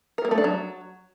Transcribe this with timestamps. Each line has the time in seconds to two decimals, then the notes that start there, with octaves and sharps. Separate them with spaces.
0.18 A#4
0.25 A#3
0.31 A3
0.38 D4
0.44 F#3